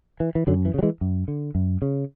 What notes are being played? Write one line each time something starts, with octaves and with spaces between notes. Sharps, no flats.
E3
E3
F#2 D3 F#3
E3
C#3
F#3
E3 G#3
F#2
D3
F#2
C#3